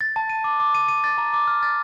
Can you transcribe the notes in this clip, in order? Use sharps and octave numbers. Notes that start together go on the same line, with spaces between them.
A6
A5
D#7
D6
D6
D#7
D#7
A6
A#5
D6
F6
A6